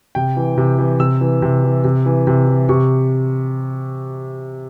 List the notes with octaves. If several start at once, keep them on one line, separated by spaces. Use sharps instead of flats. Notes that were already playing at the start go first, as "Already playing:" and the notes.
C3 G5
E3
C3
E3
C3 E6
E3
C3
E3
C3
E3
C3
E3
C3 C#6